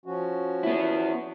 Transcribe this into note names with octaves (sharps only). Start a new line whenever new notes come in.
F3 C#4 F#4
B3 E4